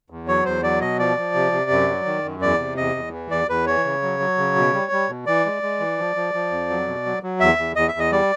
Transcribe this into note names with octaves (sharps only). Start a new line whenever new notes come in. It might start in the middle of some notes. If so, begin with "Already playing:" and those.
E2
F#3 C#5
E2 C5
F#3 D5
B2 D#5
F3 D5
F3
C3
C3
F#2
F#3
D#3
F#2
E2 D5
C3
E2 D#5
E2
E3
E2 D5
E2 B4
E3 C#5
C#3
F#3
F#3
C#3
B2
G3
G3
B2
E3 D5
G#3
G#3
E3
F3
F3
F3
F2
F#3
B2
F#3
F#3
E2 E5
E2
E2 D#5
E5
E2
D#5
G3 D5